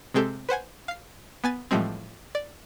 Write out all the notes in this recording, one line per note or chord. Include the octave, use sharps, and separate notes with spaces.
C3 G#3 C4 G4 A4
B4 C5 F#5 G#5
F5 C7
B3 G#5 A6
A2 E3 F3 G3 G#3 C4
D5